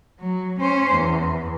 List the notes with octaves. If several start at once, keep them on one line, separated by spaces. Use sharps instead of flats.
F#3
C#4 C5
E2